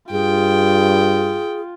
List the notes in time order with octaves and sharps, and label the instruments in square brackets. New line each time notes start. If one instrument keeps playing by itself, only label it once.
[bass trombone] G2 [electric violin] F4 [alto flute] G#4 [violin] G5